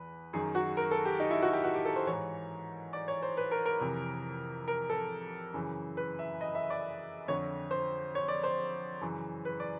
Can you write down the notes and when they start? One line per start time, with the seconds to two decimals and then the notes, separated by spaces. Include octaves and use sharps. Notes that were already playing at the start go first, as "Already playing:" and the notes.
Already playing: E2 B4
0.33 F#2 D#3 G#4
0.55 F#4
0.77 A#4
0.91 A4
1.05 G4
1.20 D#4
1.31 E4
1.42 F#4
1.53 G4
1.64 F#4
1.74 G4
1.85 A4
1.96 C5
2.07 G#2 E3 C#5
2.93 D5
3.08 C#5
3.23 C5
3.37 B4
3.51 A#4
3.66 A#4
3.80 F2 C3 E3
4.68 A#4
4.90 A4
5.54 F#2 C#3 E3
5.97 B4
6.19 E5
6.41 D#5
6.55 E5
6.70 D5
7.28 F2 D3 C#5
7.71 C5
8.15 C#5
8.28 D5
8.44 C5
9.01 F#2 C#3 E3
9.45 B4
9.60 D5